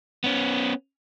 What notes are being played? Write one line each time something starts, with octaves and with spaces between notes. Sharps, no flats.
B3 C#4